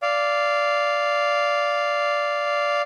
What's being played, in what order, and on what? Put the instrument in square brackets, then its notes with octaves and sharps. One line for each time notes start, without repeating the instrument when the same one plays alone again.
[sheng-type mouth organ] D5 F5